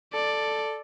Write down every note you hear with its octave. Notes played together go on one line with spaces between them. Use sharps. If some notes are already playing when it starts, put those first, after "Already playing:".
A4 D5